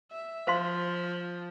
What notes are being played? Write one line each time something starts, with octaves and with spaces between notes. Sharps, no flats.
E5
F3 C5 F5 C6